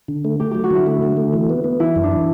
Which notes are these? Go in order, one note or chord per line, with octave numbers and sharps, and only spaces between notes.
D3
A3
A3 G4
F#3 G4
F#4
D3 E4
A3
D3
A3
E3
B3
B3
E3 E4
F#2
D4
E3